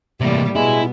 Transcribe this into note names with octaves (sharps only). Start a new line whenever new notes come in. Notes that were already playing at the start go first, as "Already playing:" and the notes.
A2 C3 E3 G3 A#3
B2 G#3 B3 E4